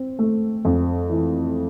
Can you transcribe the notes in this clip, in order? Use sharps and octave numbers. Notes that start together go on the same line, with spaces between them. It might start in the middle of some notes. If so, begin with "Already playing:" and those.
Already playing: C4
A3
F2
E3